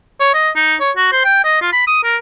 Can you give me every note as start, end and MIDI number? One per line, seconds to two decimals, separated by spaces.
0.20 0.32 73
0.34 0.50 75
0.56 0.75 63
0.80 0.91 73
0.97 1.08 66
1.12 1.20 72
1.25 1.43 79
1.44 1.59 75
1.61 1.69 65
1.73 1.84 83
1.87 1.98 87
2.04 2.17 70